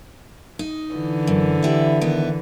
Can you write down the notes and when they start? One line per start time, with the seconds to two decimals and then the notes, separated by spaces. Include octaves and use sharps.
0.59 D#4
0.94 D3 E3
1.27 F#2
1.63 E4 G4 E5
2.01 D#3 B3 E4